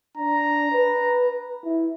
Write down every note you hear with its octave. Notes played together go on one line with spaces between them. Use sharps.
D4 A#5
B4
E4